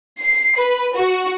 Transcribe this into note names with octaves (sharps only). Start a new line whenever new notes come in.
C7
B4
F#4